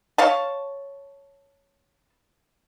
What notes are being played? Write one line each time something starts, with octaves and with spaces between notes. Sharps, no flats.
C#5 F5 A5